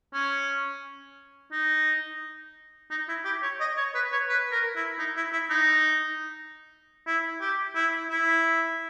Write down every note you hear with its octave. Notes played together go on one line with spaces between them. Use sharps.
C#4
D#4
D#4
E4
G4
C#5
D#5
C#5
B4
C#5
B4
A#4
E4
D#4
E4
E4
D#4
E4
G4
E4
E4